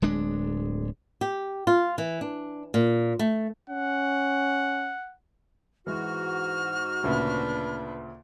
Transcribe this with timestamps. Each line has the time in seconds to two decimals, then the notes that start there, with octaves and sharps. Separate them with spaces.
0.02 D1 G#3 D4
1.21 G4
1.67 F4
1.98 E3
2.21 D4
2.74 A#2
3.19 A3
3.70 C#4 F#5
5.87 G#2 E3 G#3 F#4 F6
7.03 D2 A#2 C#3 D4 B4